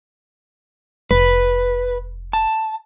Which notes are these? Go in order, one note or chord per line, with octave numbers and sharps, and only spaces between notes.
F1 B4
A5